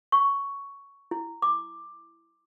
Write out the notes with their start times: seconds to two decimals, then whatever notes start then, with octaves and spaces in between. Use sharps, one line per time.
0.12 C#6
1.11 E4
1.42 D6